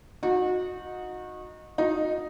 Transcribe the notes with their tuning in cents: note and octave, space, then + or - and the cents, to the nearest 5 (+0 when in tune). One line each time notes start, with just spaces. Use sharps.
D#4 +0 F#4 -25
D#4 +0 F#4 -45